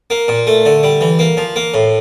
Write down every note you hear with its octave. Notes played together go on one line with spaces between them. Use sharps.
A#3
A#2
A3
D3
G3
E3
A#3
F3
A#3
A2